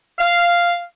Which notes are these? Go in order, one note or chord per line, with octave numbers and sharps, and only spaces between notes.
F5